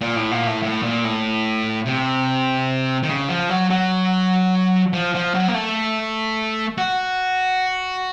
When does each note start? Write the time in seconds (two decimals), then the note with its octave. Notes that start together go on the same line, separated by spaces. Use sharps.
0.01 A#2
0.16 A2
0.31 A#2
0.47 A2
0.63 A2
0.82 A#2
1.04 A2
1.86 C3
3.03 D#3
3.09 C#3
3.29 F3
3.49 F#3
3.70 F#3
4.93 F3
5.15 F3
5.35 F#3
5.48 A#3
5.55 A3
6.78 F#4